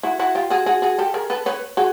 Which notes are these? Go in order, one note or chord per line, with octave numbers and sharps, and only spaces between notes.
E4 F#4
E4 F#4
F4 G4
F#4 G#4
F#4 G#4
F#4 G#4
G4 A4
G#4 A#4
A4 B4
B4 C#5
F#4 G#4